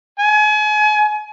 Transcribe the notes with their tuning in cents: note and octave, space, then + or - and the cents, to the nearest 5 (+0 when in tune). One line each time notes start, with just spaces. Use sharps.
G#5 +35